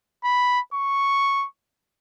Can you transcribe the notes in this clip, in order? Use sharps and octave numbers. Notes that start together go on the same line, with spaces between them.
B5
C#6